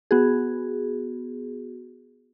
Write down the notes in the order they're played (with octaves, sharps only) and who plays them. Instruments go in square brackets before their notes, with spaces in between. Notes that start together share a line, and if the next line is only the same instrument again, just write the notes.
[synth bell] B3 F#4 G#4